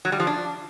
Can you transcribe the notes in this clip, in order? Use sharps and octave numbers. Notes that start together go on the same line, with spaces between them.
F#3
G3
F3
D4